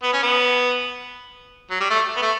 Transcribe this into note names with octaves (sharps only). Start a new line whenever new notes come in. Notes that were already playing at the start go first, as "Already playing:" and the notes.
B3
C#4
B3
F#3
G3
A3
B3
A3